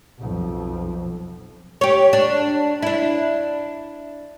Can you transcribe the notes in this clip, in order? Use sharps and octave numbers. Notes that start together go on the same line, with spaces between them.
B1 F2
G4 C#5
D4
D4 E4